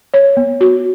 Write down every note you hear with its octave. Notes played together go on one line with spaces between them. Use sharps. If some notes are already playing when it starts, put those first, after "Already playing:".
C#5
B3
F#4